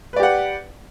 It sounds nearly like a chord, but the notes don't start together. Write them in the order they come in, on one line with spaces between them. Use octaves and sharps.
B4 D5 G4 F#5